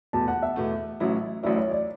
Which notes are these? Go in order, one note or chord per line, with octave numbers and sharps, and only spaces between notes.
E2 B2 A3 A5
F#5
E5
E2 B2 A3
A1 A2 F#3 C#4 E4
A1 A2 F#3 C#4 E4 D5
C#5
D5